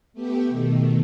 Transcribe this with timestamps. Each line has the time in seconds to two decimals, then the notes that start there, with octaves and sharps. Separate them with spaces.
0.13 A3 B3 G4
0.48 B2 D#3 A3